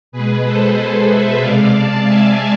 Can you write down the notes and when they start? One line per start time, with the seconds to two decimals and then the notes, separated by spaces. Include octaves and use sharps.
0.12 B2 G#4 B4
0.17 G#3
0.44 A4 C5
1.08 C5 E5
1.40 C3 G#3 D5 F5
1.73 F5 A5
2.04 E5 G#5